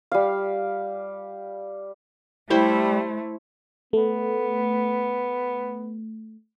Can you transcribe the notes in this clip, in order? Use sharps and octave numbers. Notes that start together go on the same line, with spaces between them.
G3 F5
G3 A3 E4 C5 C#5
A3 B3